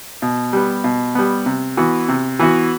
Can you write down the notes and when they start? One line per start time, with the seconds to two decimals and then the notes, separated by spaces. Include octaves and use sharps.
0.22 B2
0.53 G3 B3
0.84 B2
1.15 G3 B3
1.46 C3
1.77 E3 B3 F#4
2.09 C3
2.39 E3 B3 F#4